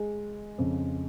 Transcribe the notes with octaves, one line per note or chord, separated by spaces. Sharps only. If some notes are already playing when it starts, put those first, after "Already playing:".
Already playing: G#3
F2 C#3